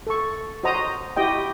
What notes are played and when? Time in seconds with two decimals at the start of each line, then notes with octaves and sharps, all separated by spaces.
0.07 A4 C#6
0.64 F#4 C5 D#5 A#5 D#6
1.16 E4 F#4 G4 D#5 G5